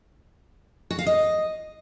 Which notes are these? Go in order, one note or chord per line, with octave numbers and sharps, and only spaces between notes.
F#4
F5
D#5